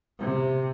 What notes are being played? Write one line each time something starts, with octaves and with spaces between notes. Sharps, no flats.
C3